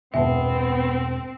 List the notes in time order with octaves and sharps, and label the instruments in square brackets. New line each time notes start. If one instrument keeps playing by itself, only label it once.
[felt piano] E1 A5 [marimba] G2 A#2 E5 [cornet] B3 [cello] C4